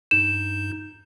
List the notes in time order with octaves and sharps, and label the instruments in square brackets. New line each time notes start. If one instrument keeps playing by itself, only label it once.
[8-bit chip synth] G2 D#4 G6 [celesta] E7